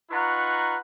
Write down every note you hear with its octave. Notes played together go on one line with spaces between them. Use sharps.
D#4 F4 B4 F#5 A#5 C#6